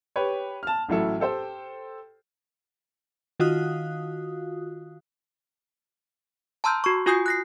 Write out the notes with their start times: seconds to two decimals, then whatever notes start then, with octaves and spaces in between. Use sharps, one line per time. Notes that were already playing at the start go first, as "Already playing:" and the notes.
0.16 G4 B4 C#5
0.63 A5 F6
0.88 A1 A2 F#3 E4 A4
1.20 G4 A4 C5 G5
3.40 D#3 F4 F#4 F5 D#6 F#6
6.64 A5 A#5 C6 E6 F6 G6
6.84 F#4 C#6
7.06 F4 F#4 G#5 D#6 G6 C7
7.26 F#6 A#6 C7